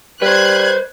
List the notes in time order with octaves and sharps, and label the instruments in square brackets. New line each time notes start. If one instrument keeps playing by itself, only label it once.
[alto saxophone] G3 [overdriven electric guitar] B4 C5 [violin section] F#6 G#6